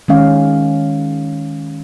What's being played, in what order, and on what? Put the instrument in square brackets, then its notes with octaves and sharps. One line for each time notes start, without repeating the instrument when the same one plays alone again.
[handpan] D#3 G#3 C#4 F5